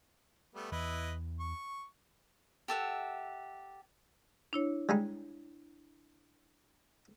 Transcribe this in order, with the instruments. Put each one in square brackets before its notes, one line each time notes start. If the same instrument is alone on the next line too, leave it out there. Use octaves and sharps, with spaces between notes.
[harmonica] G3 A3 B3
[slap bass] E2 E3 [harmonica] E4 B4 D#5
[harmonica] C#6
[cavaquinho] G4 A4 E5 F#5
[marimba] D4 E4 C#5
[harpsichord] G3 G#3 D#4